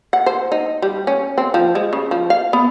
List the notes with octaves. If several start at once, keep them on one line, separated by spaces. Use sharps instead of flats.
F#5
C5
D#4
G3
C#4
C4
F3
G#3
C#3
F3
F5
B3